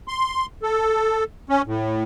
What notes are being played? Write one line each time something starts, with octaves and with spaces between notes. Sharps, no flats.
C6
A4
C#4
A2